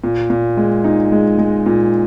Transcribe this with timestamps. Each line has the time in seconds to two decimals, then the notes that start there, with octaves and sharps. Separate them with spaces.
0.04 A#2
0.30 A#2
0.57 G#3
0.84 D#4
1.12 G#3
1.38 G#3
1.66 A#2